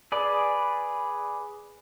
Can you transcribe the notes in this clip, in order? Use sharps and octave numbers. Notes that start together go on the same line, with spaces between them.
G#4 B4 D5